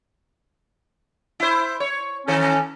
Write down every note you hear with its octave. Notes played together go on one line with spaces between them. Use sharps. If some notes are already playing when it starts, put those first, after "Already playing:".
E4 C5
C#5
D#3 C#4 A4